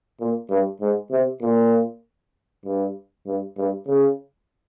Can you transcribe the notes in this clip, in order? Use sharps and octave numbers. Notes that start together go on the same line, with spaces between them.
A#2
G2
G#2
C3
A#2
G2
G2
G2
C#3